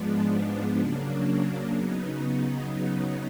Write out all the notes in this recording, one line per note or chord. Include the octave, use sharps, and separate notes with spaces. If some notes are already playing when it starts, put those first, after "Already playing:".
Already playing: G#2 F3 G#3 B3 D4
C#3 F#3 A#3 D4
C#3 F#3 B3 D#4